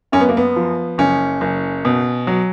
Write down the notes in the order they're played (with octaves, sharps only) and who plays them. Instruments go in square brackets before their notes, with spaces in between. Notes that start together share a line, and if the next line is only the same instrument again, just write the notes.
[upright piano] F#2 C#4
B3
A#3
B3
F3
F#1 C#4
F#1
B2
F#3